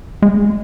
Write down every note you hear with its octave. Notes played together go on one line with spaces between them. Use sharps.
G#3